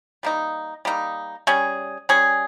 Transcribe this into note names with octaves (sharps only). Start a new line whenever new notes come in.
G3 A#3 D#4
G3 A#3 D#4
G3 C#4 G#4
G3 C#4 G#4